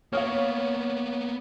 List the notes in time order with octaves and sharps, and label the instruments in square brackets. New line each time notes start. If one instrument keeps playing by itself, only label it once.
[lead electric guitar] A#3 B3 [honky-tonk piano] C#5 [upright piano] F5 D#6 F6